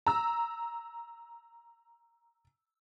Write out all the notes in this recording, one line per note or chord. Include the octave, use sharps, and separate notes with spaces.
A#5 E6